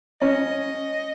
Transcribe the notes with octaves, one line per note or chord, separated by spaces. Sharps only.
C#4 D#5